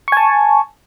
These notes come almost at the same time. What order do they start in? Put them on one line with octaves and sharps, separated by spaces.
C#6 G#5 A5